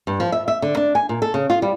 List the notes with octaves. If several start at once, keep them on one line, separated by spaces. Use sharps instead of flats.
G2
F3
E5
E5
D3
D4
G#5
A#2
A4
C#3
F4
G3